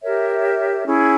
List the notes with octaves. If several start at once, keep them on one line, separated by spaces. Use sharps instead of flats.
G4 A#4 C#5 E5
C#4 E4 G#4